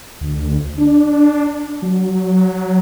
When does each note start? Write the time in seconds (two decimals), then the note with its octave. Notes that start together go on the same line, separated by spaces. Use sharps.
0.21 D2
0.78 D4
1.82 F#3